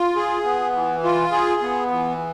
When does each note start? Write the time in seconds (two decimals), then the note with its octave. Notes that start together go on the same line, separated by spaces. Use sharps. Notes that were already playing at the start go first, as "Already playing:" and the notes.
Already playing: F4
0.16 G#4
0.44 B3
0.73 E3
1.03 F4
1.32 G#4
1.62 B3
1.90 E3